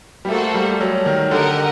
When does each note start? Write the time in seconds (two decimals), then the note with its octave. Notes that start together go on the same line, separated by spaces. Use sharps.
0.25 G3
0.29 A3 A#3 F#4 A4 C5 F#5
0.54 G3
0.81 F#3
1.06 D#3
1.31 D3 G4 A#4 D#5 F#5